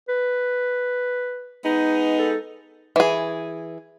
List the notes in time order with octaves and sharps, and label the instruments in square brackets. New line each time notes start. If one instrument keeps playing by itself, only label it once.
[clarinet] B4
[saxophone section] G#3 B3 D#4
[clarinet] A4
[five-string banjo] E3 G#4